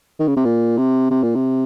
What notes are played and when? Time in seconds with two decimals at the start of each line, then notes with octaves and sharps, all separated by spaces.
0.19 D#3
0.27 C#3
0.36 C3
0.45 A#2
0.78 C3
1.11 C3
1.23 A#2
1.35 C3